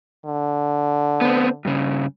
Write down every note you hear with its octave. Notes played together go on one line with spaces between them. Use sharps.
D3
B3 C4
G2 C#3